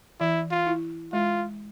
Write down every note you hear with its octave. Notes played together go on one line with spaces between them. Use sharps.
E3 E4
F4
E4
G#3 F4